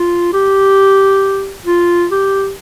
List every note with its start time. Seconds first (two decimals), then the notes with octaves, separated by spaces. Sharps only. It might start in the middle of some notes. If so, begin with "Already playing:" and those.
Already playing: F4
0.33 G4
1.66 F4
2.11 G4